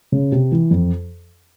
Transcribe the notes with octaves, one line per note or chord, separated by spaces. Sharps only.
C#3
C3
E3
F2